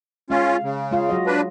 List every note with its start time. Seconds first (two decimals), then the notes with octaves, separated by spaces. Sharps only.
0.30 G#3 C#4 F4 F5
0.63 C#3
0.91 G#3 F4 F5
1.09 F#3 F#4 D#5
1.27 D4 B4